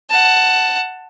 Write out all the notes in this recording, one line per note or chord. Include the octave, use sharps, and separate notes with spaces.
F#5 A5